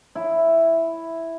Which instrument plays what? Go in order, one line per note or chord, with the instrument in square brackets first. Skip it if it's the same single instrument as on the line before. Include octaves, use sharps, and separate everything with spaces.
[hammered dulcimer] E4